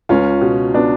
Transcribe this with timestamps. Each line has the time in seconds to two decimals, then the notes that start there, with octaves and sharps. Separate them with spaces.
0.09 C#2 C#4 F4
0.41 B2
0.74 B3 D4